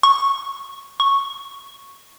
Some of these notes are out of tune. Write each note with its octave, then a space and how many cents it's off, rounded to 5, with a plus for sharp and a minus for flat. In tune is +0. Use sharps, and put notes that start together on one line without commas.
C#6 -10
C#6 -5